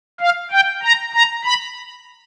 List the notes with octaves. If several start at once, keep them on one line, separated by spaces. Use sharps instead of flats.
F5
G5
A#5
A#5
B5